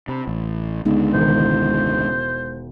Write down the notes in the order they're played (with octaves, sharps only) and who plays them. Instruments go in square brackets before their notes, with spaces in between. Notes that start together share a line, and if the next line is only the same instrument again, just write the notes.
[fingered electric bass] C3 [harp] D4 B5
[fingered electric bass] A1
[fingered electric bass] C#2 D3 [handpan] G#3 B3 D#4
[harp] E1 D#3 [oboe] C5